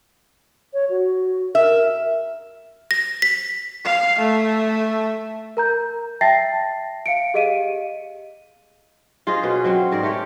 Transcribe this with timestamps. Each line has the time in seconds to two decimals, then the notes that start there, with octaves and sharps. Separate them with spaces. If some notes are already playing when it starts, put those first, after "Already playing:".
0.74 C#5
0.90 F#4
1.55 A#4 E5
2.91 A#6
3.22 B6
3.85 F5
4.19 A3
5.57 A#4 A#5 G6
6.21 E5 G5 A5 A6 A#6 C7
7.06 F5 C#7 D7
7.34 G4 G#4 D#5 F5 D7 D#7
9.27 F4 G#4 C5 D#5
9.43 B2 G#3 C#4 B4
9.64 F#3 C4 C#4
9.92 G#2 A#4 D5
10.03 A3 G4 C#5